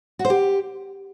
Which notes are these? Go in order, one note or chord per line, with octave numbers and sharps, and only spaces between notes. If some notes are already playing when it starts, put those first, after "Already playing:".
F#4
C5
G4